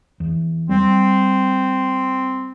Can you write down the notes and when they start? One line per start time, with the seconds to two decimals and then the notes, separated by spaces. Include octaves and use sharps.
0.20 E2
0.69 G3 C4